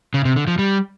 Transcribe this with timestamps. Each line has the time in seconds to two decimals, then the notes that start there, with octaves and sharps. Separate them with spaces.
0.14 C#3
0.25 C3
0.36 D3
0.47 F3
0.59 G3